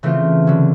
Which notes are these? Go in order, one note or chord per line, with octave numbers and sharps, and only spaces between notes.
C#3 E3 A3 C4 F4
D3 F#3